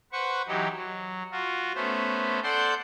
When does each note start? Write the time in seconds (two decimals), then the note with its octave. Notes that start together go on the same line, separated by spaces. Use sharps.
0.12 B4 C5 F#5 C#6
0.47 E3 F#3 D#4 G4
0.76 F#3
1.32 F4 F#4
1.75 A3 B3 C#4 C5
2.43 A4 C5 D5 F#5 C6 G6